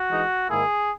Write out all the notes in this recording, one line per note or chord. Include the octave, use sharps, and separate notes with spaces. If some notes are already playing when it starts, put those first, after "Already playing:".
Already playing: F#4
E3 G#3 D#4
G#2 D#3 A#3 E4 G#4